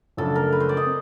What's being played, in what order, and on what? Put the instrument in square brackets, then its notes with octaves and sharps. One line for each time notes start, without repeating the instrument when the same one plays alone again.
[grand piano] F#2 C#3 F3 A3 D4 [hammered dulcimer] A4
[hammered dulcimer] A#4
B4
C5
D5
D#5
[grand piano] C4